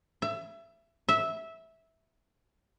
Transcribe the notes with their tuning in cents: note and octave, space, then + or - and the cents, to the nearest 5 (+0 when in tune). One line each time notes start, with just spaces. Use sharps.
E5 +25
E5 -10